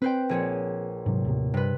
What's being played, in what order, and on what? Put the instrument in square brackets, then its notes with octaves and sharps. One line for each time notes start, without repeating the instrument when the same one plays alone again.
[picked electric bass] C4 [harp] B4 C5 G5
[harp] A#1 G#4 C#5
[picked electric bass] G#2 C3 F#3
D#2 A2 C3
[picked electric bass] G2 [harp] C3 B4